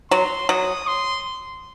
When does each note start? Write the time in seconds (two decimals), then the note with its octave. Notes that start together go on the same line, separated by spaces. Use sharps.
0.11 F#3 C6
0.49 F#3 D#6
0.87 C6